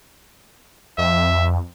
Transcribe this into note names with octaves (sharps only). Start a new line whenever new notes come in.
F2 E5